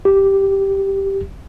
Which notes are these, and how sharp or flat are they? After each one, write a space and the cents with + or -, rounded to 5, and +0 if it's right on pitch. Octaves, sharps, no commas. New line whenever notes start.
G4 -5